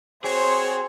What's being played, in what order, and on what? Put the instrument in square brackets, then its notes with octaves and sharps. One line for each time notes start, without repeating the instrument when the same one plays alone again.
[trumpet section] C4 F#4 C#5 [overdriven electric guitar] G#4 [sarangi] C5